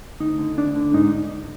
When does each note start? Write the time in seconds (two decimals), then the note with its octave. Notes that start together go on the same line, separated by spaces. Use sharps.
0.20 D2 D#4
0.39 D3
0.57 D2 D4
0.76 D3
0.94 G#2 D#4